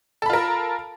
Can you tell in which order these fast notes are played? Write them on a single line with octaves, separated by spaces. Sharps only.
A4 B5 F4 A#4